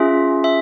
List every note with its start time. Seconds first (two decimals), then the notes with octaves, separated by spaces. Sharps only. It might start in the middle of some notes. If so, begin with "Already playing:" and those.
Already playing: C#4 F4 G#4 E5
0.44 E5